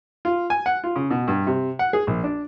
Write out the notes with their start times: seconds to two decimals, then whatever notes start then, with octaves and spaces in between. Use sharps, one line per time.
0.25 F4
0.50 G#5
0.66 F#5
0.84 F4
0.96 C#3
1.10 B2
1.28 G2
1.47 C3
1.79 F#5
1.93 G#4
2.07 A#1
2.24 D4